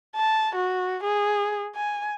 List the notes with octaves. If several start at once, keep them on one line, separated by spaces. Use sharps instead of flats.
A5
F#4
G#4
G#5